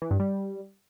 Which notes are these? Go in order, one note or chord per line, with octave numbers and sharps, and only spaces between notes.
E3
G2
G3